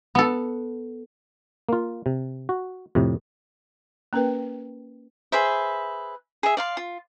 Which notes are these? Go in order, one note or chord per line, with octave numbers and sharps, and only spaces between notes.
B3 A4
A#3 F4
C3
F#4
F2 A2 C3
A#3 C#4 A#4 B4 G5
G#4 B4 C5 E5
G#4 E5
D5 F5 C6
F4